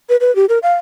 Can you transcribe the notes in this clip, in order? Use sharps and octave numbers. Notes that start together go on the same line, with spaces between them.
B4
B4
G4
A#4
F5